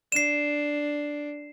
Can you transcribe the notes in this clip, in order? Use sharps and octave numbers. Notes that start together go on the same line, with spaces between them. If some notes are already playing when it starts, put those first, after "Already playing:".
D4 C7 E7